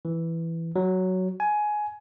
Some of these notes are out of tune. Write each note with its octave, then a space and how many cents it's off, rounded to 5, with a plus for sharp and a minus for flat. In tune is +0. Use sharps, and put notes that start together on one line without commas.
E3 +5
F#3 +5
G#5 +15